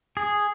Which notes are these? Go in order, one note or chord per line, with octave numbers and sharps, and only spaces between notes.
G#4